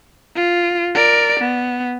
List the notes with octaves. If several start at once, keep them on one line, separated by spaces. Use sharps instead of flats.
F4
A#4 D5
B3